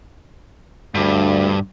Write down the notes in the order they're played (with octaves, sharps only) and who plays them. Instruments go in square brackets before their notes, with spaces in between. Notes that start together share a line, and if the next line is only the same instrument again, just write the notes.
[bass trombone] D2 [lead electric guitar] G2